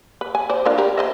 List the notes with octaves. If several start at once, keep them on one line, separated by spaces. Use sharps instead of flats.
B4
G#5
C5 D5
D4 F4 A#4
G4 A#4
C5 D#5 E5